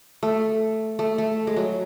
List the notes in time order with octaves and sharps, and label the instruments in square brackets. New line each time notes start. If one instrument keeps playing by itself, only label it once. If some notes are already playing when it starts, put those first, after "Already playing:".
[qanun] A3
A3
A3
G#3
F#3